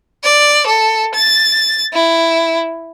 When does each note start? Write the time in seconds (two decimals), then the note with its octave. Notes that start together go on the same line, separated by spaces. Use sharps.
0.24 D5
0.67 A4
1.15 A6
1.94 E4